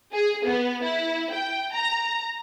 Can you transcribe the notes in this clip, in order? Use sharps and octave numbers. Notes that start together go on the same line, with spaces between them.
G#4
B3
E4
G5
A#5